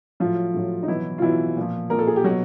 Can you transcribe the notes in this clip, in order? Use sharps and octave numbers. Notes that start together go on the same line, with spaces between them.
A2 F3 F#3 F4
A2 F#3
D#4
B2 E3 F#3 E4
F4
B2 E3 F#3 E4
A#2 F3
A#2 F3 A#4
A4
G#4
G4
B2 F#3 F#4